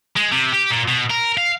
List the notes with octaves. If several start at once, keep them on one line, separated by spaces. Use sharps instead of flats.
G#3
C3
G4
A#2
B2
A#4
F5